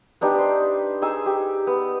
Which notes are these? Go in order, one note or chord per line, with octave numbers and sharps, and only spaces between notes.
B3 D4 D#4 G4
B4 C5
D#4 G#4 G#5 E6
G4
B3